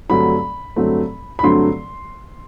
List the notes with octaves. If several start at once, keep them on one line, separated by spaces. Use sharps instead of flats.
G2 D3 F#3 A3 C4 B5
G2 D3 F#3 A3 C4
B5
G2 D3 F#3 A3 C4 C6